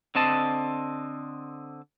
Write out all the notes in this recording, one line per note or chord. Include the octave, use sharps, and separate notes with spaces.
D3 C4 D#5 A5